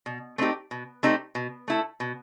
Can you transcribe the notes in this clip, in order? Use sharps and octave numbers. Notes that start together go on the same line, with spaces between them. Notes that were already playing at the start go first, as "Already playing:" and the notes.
B2
A3 C4 D#4 G4
B2
A3 C4 D#4 G4
B2
A3 E4 A4
B2